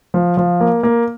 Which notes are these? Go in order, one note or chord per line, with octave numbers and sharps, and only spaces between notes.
F3
F3
A#3
A#3